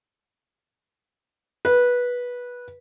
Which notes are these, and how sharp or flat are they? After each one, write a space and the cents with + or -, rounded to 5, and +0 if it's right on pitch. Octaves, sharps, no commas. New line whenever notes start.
B4 -15